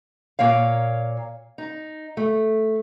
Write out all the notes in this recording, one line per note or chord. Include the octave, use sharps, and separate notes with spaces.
A#2 A#3 C#5 F5
D#4
A3